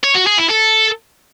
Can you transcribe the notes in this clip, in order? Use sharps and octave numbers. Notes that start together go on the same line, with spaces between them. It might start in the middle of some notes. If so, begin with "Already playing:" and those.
C#5
F#4
G#4
E4
A4